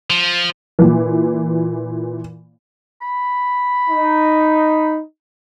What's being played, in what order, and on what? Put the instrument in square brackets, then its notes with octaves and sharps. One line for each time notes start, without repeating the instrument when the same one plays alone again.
[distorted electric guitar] F3
[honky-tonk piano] A#2 E3
[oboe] B5
[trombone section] D#4